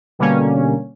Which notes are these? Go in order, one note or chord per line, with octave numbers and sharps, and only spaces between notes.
B2 D3 G3 A#3 C#4